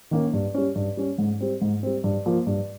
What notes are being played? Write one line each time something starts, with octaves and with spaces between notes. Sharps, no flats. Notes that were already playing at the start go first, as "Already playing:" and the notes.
D#3 A#3 C#4
G2
G3 C#4
G2
G3 C#4
G#2
G3 C4
G#2
G3 C4
G2
F3 A#3
G2